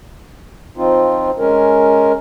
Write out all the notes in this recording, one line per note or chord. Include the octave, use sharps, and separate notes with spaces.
F3 C4 D#4 F4
G#3 C#4 A#4